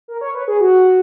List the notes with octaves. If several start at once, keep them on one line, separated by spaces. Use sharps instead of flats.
A#4
C#5
B4
G#4
F#4